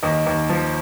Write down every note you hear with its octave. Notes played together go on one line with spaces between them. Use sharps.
D#2 D#5
D#2
F3